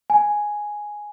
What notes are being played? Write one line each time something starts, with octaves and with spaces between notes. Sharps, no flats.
G#5